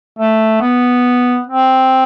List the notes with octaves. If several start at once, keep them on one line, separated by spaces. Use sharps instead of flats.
A3
B3
C4